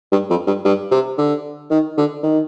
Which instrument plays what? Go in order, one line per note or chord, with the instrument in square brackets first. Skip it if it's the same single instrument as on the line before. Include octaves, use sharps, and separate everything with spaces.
[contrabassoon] G2
F2
G2
G2
C3
D3
D#3
D3
D#3